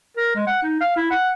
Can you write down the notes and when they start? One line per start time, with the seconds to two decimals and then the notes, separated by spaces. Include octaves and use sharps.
0.17 A#4
0.36 G#3
0.47 F#5
0.63 D#4
0.81 F5
0.97 E4
1.11 F#5